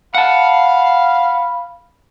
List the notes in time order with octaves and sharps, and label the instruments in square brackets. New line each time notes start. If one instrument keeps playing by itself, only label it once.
[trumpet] F5 [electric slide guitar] F#5 A5 [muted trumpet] B5